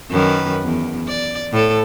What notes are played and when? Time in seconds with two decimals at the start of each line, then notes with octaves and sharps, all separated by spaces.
0.11 F#2 D#3 B4
0.64 E2
1.08 D5
1.52 A2 A4